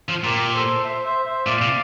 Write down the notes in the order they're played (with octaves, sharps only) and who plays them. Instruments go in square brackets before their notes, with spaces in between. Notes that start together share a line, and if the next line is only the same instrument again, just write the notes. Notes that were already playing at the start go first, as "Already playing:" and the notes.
[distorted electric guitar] F3
[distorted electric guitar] A#2 [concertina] G4 A#4
[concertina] A4 C5
C5 E5
C5 E5
C5 E5
[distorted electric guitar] A#2 [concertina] D5 F5
[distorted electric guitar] C3